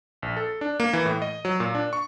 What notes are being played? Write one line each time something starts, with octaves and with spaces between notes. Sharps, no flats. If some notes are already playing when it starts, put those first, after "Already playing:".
A#1
A4
D4
A#3
E3
A2
D#5
F#3
A#2
D4
C#6